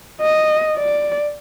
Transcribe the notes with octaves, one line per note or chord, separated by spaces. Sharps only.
D#5
D5